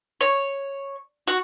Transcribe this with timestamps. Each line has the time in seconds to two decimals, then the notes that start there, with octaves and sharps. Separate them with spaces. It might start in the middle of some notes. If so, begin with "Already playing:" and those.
0.21 C#5
1.28 F#4